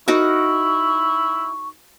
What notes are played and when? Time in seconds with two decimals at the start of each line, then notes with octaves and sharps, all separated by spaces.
0.08 D#4 E4 F#4 A#4 C#6